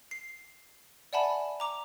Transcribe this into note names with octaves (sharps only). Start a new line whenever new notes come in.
C7
D5 E5 F#5 G#5 A5 B5
A#5 D6 F7